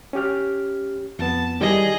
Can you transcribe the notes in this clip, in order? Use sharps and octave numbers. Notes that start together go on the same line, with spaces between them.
C#4 G4 F6
F2 B3 A5
D#3 G3 E4 G#4 D#5